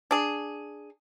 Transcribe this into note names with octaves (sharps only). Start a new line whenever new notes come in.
D4 G#4